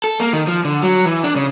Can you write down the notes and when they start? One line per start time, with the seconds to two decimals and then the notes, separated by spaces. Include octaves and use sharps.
0.04 A4
0.20 A#3
0.33 D#3
0.47 F3
0.65 D3
0.82 F#3
1.06 E3
1.24 D4
1.36 C#3